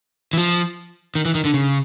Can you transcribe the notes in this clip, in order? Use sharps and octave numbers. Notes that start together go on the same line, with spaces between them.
E3
F3
D#3
E3
D#3
D3
C#3